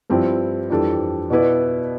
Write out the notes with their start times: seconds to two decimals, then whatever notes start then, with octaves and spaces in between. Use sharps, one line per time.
0.10 G2 F3 C4 E4
0.70 F2 E3 G3 D4 A4
1.30 B2 B3 E4 B4 D5